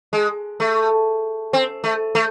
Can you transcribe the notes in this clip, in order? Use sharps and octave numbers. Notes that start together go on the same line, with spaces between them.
G#3
A3
C4
A3
A3